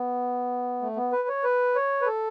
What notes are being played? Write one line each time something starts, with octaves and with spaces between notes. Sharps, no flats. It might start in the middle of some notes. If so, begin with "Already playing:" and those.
Already playing: B3
A3
B3
B4
C#5
B4
C#5
B4
A4